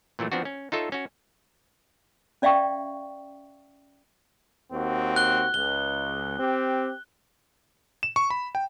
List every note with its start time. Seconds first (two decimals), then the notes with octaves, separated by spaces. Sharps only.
0.19 A#2 E3 F#3 A3
0.32 F3 B3 C4 D4 F#4
0.45 C#4
0.72 D#4 F4 A4 C#5 E5
0.92 C#4 F#4
2.42 C#4 D5 E5 F5 G5 C#6
4.72 D#2 C4 F#4
5.16 F#6 G7
5.54 C#2 G7
6.39 C4 G4
8.03 E7
8.16 C#6
8.30 B5
8.55 G5